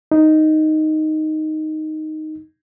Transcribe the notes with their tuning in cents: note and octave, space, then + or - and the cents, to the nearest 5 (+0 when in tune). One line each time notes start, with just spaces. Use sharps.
D#4 +0